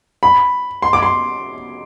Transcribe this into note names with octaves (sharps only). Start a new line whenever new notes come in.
B5
C6
D6
C6